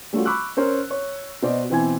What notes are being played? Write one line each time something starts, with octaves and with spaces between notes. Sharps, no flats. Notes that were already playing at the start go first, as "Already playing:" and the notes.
G3 A3 C#4 F4 F#4
B5 C#6 D6 E6 F#6
C#4 A#4 C5
C#5
B2 C5 D5 D#5
B2 E3 C4 E4 G#5 G#6